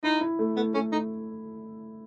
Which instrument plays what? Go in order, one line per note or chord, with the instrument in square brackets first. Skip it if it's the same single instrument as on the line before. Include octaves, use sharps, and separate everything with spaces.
[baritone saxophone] D#4 [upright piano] E4
[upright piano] E4
A3
[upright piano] A3 [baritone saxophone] B3
[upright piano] A3 [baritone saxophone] C#4
[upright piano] A3 [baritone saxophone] D#4